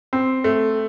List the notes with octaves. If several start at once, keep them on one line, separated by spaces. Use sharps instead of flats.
C4
A3